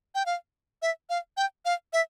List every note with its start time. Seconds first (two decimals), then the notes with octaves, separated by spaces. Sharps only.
0.15 G5
0.26 F5
0.82 E5
1.10 F5
1.37 G5
1.65 F5
1.93 E5